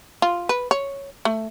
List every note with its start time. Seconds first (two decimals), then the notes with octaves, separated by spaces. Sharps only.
0.22 F4
0.49 B4
0.71 C#5
1.25 A3